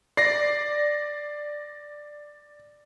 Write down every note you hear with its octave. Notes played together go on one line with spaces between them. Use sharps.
D5 A#6 C7